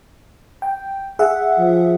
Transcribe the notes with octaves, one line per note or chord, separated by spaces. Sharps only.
G5
G#4 E5 F#5
F3